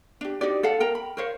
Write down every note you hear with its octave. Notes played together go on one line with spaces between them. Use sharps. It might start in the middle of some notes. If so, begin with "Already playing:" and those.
D4 G4
D#4 F#4 G4 D5
A4 F5 F#5
A#4 G5 A#5
B5
A#4 C5 C#5 F5